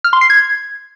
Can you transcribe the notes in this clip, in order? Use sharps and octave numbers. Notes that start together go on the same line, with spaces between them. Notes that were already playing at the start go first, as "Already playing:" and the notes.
F6
C6
C7
G#6